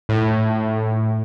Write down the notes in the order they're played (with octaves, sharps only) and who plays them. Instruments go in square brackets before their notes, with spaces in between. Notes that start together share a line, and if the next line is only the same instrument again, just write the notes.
[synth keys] A2